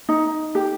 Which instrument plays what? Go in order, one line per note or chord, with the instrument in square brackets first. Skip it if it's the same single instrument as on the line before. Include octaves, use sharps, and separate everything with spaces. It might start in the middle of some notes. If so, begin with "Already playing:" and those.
[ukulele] D#4
G4